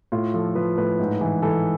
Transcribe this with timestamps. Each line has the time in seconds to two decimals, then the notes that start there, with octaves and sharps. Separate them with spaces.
0.12 A2 F4
0.34 F3 A4
0.55 F3 B4
0.77 A2 B4
0.99 G#2
1.21 E3
1.42 E3 A4